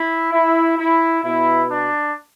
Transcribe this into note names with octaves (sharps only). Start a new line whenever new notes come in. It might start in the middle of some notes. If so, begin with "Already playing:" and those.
Already playing: E4
E4
E4
B2 B3 E4
D4